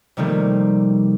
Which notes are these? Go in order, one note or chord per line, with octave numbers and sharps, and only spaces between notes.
C3 D#3 F3 G3 A3 A#3